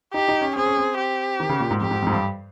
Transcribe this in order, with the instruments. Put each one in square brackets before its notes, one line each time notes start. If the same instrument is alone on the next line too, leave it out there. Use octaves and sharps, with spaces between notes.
[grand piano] D#4 [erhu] G4
[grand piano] D#4
C#4
[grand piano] C4 [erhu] G#4
[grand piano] C#4
C4
[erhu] G4
[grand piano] D#3
C#3
A#2
G#2
[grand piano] F2 [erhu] G4
[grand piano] G#2
F2 G#2
G2